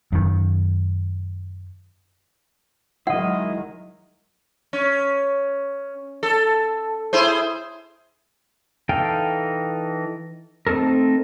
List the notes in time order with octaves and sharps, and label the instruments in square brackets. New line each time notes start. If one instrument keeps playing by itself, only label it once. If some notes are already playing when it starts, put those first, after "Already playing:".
[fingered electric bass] F#2 D#3
[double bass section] D#3 F#3 G#3 [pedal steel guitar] E4 D#5 [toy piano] F#5
[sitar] C#4
A4
E4 G#4 C5
[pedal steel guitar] E3 D#4 A4 F5 G5
A3 C4 D#4 A4 A#4